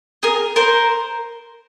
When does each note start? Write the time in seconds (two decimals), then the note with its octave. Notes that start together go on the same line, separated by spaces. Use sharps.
0.23 G#4 A#4
0.56 A#4 C5